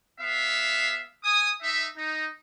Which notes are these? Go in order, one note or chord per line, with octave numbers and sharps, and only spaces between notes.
B3 E5 F5
G#5 D#6
D#4 E5
D#4